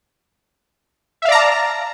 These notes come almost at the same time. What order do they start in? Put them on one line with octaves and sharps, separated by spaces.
E5 F5 D5 A#5 A5